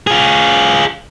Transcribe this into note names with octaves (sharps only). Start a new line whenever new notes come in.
F4 G#4